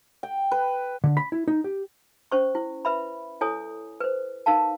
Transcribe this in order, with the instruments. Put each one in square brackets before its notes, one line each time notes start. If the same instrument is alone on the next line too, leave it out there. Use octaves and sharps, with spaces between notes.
[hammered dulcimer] G5
B4
[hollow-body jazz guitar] D3
B5
E4
D#4
G4
[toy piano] C#4 C5 C#6
E4
B4 E5 B5
E4 A4 C#5 G#5 D#6
B4 C5
D#4 A#4 F5 A5